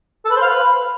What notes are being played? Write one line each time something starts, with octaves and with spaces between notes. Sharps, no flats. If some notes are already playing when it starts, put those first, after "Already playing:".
A4
B4
C5
F5
B4